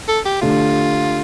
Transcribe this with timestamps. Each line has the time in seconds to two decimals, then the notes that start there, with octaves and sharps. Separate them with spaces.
0.08 A4
0.25 G4
0.41 D3 A3 D4 F4 G4